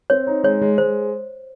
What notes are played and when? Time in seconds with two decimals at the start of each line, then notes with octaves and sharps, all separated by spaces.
0.10 C4 C#5
0.27 D#4
0.44 G#3 C#5
0.61 G#3
0.78 G#3 C5